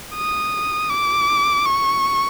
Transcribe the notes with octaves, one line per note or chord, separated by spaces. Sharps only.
D#6
D6
C#6